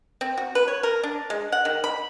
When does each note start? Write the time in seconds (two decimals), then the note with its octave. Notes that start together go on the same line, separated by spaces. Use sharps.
0.21 C4
0.37 F#4
0.55 B4
0.68 C#5
0.83 A#4
1.04 D4
1.30 G#3
1.52 F#5
1.65 D#3
1.84 B5